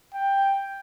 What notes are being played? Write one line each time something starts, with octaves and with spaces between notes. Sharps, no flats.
G5